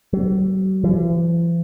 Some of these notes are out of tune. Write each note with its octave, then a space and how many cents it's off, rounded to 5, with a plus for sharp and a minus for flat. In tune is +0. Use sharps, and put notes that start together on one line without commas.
F#3 +45
E3 +45